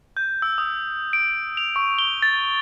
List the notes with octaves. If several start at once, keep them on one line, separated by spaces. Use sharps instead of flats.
G6
E6
D#6
D7
F7
C#6
G7
A6